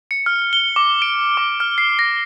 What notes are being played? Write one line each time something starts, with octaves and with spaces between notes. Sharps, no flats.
C#7
F6
G7
D6
D7
D6
F6
C7
A#6